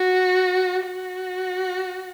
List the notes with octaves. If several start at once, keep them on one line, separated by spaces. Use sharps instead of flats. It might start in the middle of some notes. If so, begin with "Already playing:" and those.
Already playing: F#4
F#4